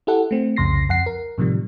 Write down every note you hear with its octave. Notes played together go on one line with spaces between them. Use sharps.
E4 G4 A4 F#5
A3 C4
C2 F2 C#3 C6 A#6 C7
F2 F#5 C7
A#4
A2 C3 D#3 F3 G3